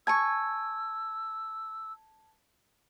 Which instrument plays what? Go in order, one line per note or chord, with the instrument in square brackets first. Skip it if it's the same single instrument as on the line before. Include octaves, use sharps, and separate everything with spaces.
[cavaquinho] G#5 C#6 [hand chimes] A5 G#6 [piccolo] E6